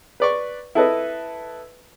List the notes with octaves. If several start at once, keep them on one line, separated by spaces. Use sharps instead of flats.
B4 D5 C#6
E4 A4 B4 D#5